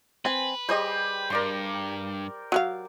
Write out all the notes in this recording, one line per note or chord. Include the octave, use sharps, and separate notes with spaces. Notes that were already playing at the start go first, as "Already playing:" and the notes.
C4 B4 G#5
G3 G4 G#4 C5 D#5
G2 A#4 D5 C6
F#3 F#4 F5